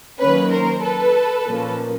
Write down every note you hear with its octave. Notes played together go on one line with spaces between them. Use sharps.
D#3 F#3 A#3 C#4 B4 C#5
A#4 C5
A4 B4
A#2 F3 A#3 C#4